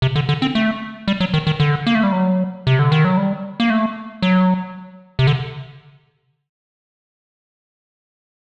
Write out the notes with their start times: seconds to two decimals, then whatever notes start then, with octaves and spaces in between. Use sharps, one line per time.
0.02 C3
0.16 D3
0.29 D3
0.42 C4
0.55 A3
1.08 G3
1.20 F#3
1.34 D#3
1.47 D#3
1.60 D3
1.87 A#3
1.95 A3
2.03 G3
2.12 F#3
2.67 C3
2.79 D3
2.92 D#3
3.05 F#3
3.17 G3
3.60 A#3
3.70 A3
4.22 F#3
5.19 C3
5.27 D3